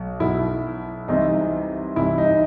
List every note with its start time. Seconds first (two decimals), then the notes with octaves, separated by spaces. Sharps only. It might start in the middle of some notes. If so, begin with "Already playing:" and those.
Already playing: B1
0.20 B1 B2 E4
1.08 C2 C3 E3 D#4
1.96 C2 C3 E3 E4
2.18 D#4